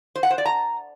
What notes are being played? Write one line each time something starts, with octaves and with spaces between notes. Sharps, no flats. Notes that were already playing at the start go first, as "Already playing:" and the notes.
C5
F#5
C5
D5
A#5